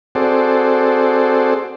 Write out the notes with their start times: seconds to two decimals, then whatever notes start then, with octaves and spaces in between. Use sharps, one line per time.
0.15 C4 F#4 G#4 A4 C5 D5